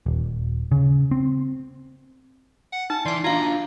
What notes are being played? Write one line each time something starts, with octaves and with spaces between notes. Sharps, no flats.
D#1
C#3
C4
F#5
D#4 A5
E3 D5 A5 C6
D4 F4 F#4 F5 A#5